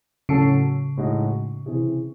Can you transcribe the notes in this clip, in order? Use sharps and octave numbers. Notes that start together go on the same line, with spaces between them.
A2 C#3 F#3 C#4 F#4 A4
A2 G#3 D#4 F#4
C3 E3 C4 E4 G#4